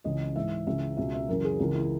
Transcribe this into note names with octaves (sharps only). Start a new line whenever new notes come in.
C#2 C#3 E3 D#5
G#2 E3 E5
C#2 C#3 E3 E5
C#2 B2 E5
E5
F#2 C#3 E3 A#4
G#4
C#2 C#3 E3 A#4
E4